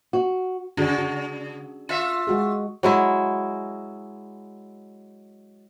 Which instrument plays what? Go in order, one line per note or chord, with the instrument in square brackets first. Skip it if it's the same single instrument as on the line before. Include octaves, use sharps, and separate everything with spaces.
[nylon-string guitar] F#4
[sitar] C#3 [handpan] D4 F#4 G#4
[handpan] F#4
[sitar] F4 E5
[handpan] G#3 F#4 G#4
[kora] F#3 G#3 E4